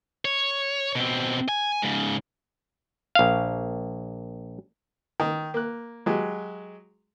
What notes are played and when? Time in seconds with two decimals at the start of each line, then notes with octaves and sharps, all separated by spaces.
0.25 C#5
0.95 B2 C4
1.49 G#5
1.82 G#2 C#3
3.15 A#1 F5
5.20 D#3
5.54 A#3 F#6
6.06 F#3 G#3 G4